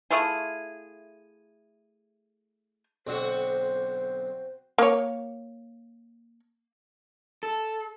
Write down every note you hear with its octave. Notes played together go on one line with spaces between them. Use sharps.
A3 E4 F4 G#4
B1 D3 C4 F#4 C5
A#3 C#5
A4